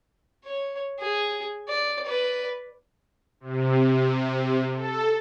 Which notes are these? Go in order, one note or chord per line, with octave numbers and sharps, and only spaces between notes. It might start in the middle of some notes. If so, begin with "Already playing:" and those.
C#5
G#4
D5
B4 D5
C3
A4